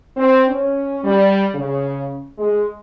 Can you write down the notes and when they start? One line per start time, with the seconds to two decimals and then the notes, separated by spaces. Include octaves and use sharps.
0.17 C4
0.48 C#4
1.04 G3
1.55 C#3
2.38 G#3